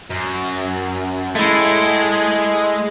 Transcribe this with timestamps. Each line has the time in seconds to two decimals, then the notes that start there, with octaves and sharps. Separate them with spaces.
0.10 F#2
1.35 G#3 A3 E4